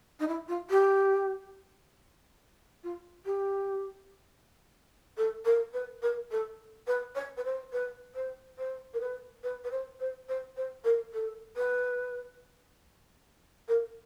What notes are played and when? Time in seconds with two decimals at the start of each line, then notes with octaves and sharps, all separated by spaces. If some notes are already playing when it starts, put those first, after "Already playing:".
0.20 D#4
0.28 E4
0.48 F4
0.70 G4
2.83 F4
3.25 G4
5.17 A4
5.45 A#4
5.74 B4
6.02 A#4
6.31 A4
6.87 B4
7.15 C#5
7.37 B4
7.45 C5
7.73 B4
8.15 C5
8.58 C5
8.94 A#4
9.00 B4
9.43 B4
9.64 B4
9.71 C5
10.00 C5
10.29 C5
10.57 C5
10.84 A#4
11.13 A4
11.56 B4
13.68 A#4